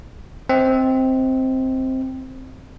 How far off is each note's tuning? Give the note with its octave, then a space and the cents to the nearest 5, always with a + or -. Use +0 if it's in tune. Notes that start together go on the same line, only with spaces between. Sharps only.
C4 +0 D#5 +35